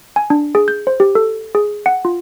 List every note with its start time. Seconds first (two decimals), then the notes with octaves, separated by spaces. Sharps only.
0.16 G#5
0.30 D4
0.55 G#4
0.68 G6
0.87 C5
1.00 G4
1.15 A4
1.55 G#4
1.86 F#5
2.05 F4